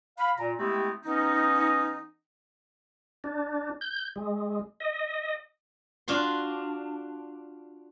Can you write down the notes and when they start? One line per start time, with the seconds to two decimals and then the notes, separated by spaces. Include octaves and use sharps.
0.18 F5 B5
0.38 A#2 A#5
0.58 G#3 A3 B3 C4 E4 G4
1.03 E3 B3 C#4 D#4
3.24 D4
3.81 G6
4.16 G#3
4.80 D#5
6.08 D4 F4 F#4 C6